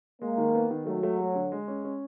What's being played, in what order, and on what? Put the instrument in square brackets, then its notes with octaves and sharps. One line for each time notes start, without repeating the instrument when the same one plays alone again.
[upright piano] G#3 [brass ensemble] A#3
[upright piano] D#3
B3
D#3
[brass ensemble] F#3 [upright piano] A3
[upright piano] A3
A3
D3
G#3
C#4
C#4